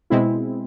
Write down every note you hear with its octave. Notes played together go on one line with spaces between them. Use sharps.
B2 G#3 C4 E4